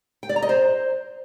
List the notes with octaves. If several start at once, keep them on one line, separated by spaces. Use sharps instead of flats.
G5
D5
A#5
D#5
C5